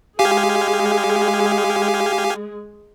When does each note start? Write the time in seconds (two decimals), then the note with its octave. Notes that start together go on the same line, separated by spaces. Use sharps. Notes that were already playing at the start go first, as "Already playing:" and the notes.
0.19 G#3 G4 G#4 F5 G#5